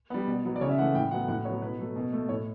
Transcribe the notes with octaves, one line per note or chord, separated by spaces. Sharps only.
G3 B3
B2
F#3 B3
D5
C#3 C#5
E5
E3 A3 F#5
A2 G5
F#3 B3 F#5
A2 F#5
F#3 B3 C#5
B2 B4
F#3 A3
B2
A3
A2 C#5